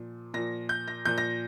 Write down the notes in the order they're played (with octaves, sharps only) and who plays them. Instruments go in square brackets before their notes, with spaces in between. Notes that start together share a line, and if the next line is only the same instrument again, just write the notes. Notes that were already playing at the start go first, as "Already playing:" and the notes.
Already playing: [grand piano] A#2 F3
A#2 F3 A#6
G6
A#6
A#2 F3 G6
A#6